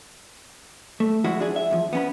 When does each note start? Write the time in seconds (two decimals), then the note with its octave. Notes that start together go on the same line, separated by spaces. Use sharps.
1.00 A3
1.24 F3 G#3 E4 F#4
1.40 D4 G#4
1.56 E5
1.71 E2 F3
1.93 B3 C#4 B5